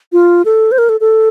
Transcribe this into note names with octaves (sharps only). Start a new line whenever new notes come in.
F4
A4
C5
A#4
A4
A4